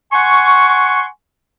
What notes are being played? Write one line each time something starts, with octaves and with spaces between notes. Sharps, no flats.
F#5 G#5 C6 C#6